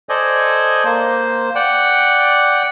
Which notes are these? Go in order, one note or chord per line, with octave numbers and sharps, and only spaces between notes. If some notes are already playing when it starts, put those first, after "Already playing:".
A4 C5 D5 D#5 G#5
A#3 C5
D5 F#5 G5